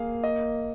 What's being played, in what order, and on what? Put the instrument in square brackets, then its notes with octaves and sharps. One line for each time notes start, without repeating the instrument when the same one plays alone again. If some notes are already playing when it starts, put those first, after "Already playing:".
Already playing: [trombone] A#3 [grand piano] G#4 F5
[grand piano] D#5